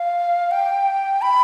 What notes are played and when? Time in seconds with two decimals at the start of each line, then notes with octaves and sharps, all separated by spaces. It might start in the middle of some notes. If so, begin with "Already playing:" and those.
Already playing: F5
0.51 G5
1.22 B5